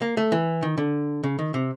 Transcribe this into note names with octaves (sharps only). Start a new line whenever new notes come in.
A#3
A3
E3
D#3
D3
C#3
D#3
C3